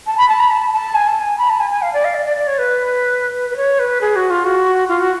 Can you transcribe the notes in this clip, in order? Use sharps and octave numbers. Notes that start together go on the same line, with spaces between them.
A5
B5
A5
B5
A5
A5
G#5
A5
G#5
B5
A5
G#5
G#5
F5
D5
F5
D5
D5
D5
C#5
B4
B4
C#5
B4
G#4
F#4
F4
F#4
F4
F#4